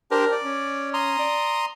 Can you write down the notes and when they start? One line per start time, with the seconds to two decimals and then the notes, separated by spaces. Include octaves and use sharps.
0.11 D4 G4 A#4 C5
0.32 D5
0.44 C#4
0.94 A#5 C6 D#6
1.19 D5